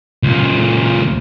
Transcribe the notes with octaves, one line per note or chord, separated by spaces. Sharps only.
C#2 A#2